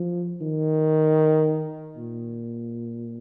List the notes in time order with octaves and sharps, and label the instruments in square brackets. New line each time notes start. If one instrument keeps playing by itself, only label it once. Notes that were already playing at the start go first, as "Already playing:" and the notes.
Already playing: [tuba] F3
D#3
A#2